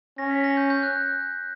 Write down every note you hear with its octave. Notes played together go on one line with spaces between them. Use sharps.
C#4 A#6
B6
A#6
G6
G6
F#6